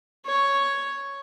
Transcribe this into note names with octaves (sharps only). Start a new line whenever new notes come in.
C#5